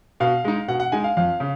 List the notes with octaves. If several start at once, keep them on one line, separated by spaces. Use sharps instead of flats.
B2 F5
G#3 D#4
B2 F#5
F#5
G#3 D#4 G#5
F5
F2 F5
C#3